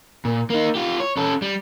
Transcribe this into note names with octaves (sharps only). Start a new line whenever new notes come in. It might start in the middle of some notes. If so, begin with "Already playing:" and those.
A#2
A#3 D#4
F4 G4
C#5
C#4 A4
G3